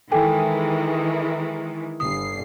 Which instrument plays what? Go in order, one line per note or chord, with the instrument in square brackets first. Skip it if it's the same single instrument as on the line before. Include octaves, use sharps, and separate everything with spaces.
[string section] D#3 E3 G#3 [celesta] A4 G5 G#5
[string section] G1 C7 [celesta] D#6